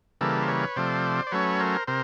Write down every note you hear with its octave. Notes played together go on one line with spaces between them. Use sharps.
C#3 E3 G3 A#3 A4 B4
C5
B4 C#5
C3 F3 A3 C5 D5
D5
F#3 A3 C#4 B4 C#5
A#4 C5
C3 A#4 C5